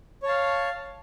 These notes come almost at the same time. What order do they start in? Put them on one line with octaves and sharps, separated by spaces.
C#5 A5 F5